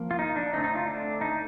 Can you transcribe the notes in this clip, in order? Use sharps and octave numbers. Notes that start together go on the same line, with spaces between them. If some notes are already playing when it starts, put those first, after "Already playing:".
Already playing: F3 A#3
F4
D#4
D4
D3 A3 C4 D#4
D#4
F4
D4
D#4